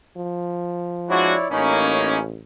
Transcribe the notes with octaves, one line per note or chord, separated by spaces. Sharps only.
F3
G#3 D4 E4 F#4 C#5 D5
A1 A#3 C#4 D#4 C#5 B5